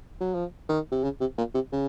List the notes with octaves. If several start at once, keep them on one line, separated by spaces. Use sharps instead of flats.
F#3
F3
D#3
C3
C#3
C3
A#2
C3
C#3